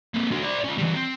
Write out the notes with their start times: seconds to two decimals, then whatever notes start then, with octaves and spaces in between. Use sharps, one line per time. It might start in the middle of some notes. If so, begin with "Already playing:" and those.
0.14 A#3 C4
0.31 D4 F#4
0.43 C5 D5
0.64 C#4 F4
0.78 E3 G3
0.94 C4